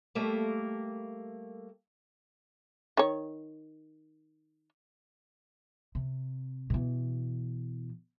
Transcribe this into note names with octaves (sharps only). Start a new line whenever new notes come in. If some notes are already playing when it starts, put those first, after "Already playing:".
G3 A3 A#3
D#3 C#5
C3
B2 E3